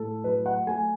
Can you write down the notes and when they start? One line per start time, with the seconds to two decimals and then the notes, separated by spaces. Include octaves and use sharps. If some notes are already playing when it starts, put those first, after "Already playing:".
Already playing: A2 A4
0.24 F#3 B4
0.46 F#5
0.67 A3 G#5